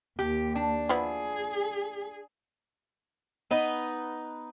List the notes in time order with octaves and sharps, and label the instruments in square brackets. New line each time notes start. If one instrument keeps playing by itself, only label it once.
[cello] D#2 [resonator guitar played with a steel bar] G4
[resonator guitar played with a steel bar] D4
[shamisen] F3 B3 E4 [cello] G#4
[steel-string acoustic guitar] B3 D#4 B4 D#5